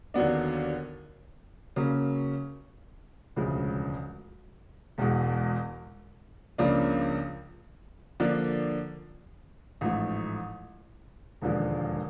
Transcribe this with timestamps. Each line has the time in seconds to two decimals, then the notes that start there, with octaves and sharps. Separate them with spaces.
0.14 D#2 D3 F#3 B3 D4
1.76 C#3 F#3 A#3 C#4
3.36 E1 D2 C#3 F3 G#3
4.98 E1 E2 B2 G#3
6.58 C#2 C#3 F3 A#3 D4
8.20 D3 F3 A#3 D4
9.81 A1 G#2 F3 A3
11.42 E1 D#2 D3 F3 G#3